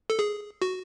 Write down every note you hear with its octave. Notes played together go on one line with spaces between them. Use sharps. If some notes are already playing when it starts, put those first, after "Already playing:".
A4
G#4
F#4